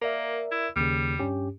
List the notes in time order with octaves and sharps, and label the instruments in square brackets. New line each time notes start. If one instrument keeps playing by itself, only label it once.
[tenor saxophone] A#3 [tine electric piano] A#4 D5 E5
[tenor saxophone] E4
[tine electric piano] D#2 C#3 [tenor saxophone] G3
[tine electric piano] G2 C#4 G4